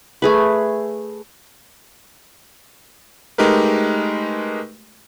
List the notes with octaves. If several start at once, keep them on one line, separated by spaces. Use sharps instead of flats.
A3 G#4 B4
G#3 A3 D#4 G4 A#4 B4